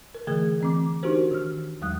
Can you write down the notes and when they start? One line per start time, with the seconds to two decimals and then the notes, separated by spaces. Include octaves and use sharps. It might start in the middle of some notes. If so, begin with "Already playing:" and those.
0.15 A#4
0.27 D3 E3 A3 G#4 G#6
0.61 E3 C4 D6
1.03 D4 D#4 F#4 G4 A#4 C5
1.31 D#3 F6
1.81 E2 F#3 G#3 D#6 F#6